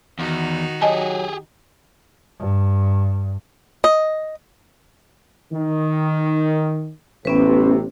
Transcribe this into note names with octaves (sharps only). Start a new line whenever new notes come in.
E2 D#3 D#4 F#4
F#3 G4 G#4 D#5 G#5 A5
G2
D#5
D#3
A1 C3 B3 C#4 B4